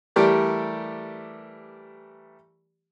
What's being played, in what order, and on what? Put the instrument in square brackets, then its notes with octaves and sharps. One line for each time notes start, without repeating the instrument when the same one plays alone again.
[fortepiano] E3 G3 A3 G4 A#4 D5